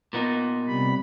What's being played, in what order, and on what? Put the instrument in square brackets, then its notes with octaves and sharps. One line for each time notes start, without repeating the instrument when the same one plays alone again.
[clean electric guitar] A#2 B3 D#4
[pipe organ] C3 G3 B5